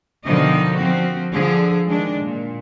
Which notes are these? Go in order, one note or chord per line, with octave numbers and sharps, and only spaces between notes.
B2 D3 D#3 F3 D#4 D#5
F3 C4 F#4
D3 F3 G#4
D#3 G#3 D4
A#2